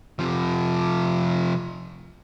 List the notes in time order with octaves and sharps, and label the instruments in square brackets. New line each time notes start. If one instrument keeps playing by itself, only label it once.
[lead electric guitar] C3 F3